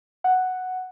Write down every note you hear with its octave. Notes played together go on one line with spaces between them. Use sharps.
F#5